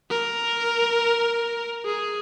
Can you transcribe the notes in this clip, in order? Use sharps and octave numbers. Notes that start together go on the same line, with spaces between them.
A#4
G#4